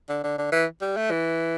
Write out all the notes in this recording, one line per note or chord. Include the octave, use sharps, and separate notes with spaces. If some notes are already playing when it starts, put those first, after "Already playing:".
D3
D3
D3
E3
G3
A3
E3